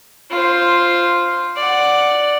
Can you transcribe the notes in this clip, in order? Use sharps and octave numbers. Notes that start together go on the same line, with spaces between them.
F4 C5
D5 F#5